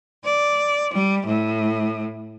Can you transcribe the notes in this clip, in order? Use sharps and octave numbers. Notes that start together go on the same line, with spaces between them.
D5
G3
A2